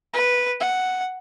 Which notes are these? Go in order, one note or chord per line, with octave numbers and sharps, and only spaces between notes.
B4
F#5